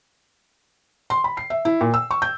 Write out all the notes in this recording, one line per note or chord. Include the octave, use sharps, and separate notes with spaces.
C6
B5
C7
E5
E4
A#2
E6
C#6
G6